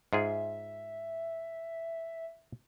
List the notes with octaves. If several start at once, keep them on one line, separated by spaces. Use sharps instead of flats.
G#2 F4 G#4 E5